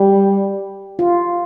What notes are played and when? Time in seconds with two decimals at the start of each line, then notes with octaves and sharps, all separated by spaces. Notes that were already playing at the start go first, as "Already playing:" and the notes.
Already playing: G3 G4
0.99 F4